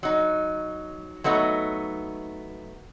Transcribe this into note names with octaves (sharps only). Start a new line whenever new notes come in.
F#3 D#4
F#3 A3 B3 D#4